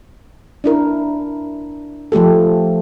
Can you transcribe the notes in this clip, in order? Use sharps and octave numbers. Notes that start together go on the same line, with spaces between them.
D4 E4 A#4
F3 A3 G4 A4